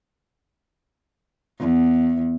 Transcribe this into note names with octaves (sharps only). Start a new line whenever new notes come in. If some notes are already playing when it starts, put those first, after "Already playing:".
E2